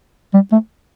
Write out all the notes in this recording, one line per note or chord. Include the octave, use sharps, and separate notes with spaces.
G3
A3